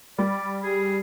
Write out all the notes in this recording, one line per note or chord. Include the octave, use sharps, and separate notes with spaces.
G3 D5
G4 G#4